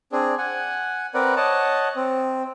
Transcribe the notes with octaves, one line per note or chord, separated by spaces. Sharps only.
C4 D4 G#4
F#5 G#5
C4 A#4 B4 D5 F#5
C#5 D#5 F#5 A5
C4